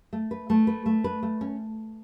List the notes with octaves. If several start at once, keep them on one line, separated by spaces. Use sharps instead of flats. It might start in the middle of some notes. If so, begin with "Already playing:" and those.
A3
B4
A3
B4
A3
B4
A3
C#4